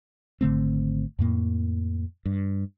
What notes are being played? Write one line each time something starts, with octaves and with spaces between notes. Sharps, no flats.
G#1 D3 A3 C4
F2 A2 A#3
G2